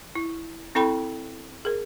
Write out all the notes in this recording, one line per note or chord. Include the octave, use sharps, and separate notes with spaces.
E4
C4 E4 A4 G5 B5
G#4 A#4